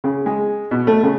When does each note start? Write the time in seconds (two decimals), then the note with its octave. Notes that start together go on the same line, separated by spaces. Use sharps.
0.04 C#3
0.26 G#3
0.71 B2
0.87 A3
1.03 C#3